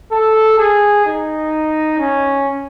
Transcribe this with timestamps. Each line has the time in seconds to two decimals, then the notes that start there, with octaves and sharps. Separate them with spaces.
0.12 A4
0.58 G#4
1.06 D#4
1.98 C#4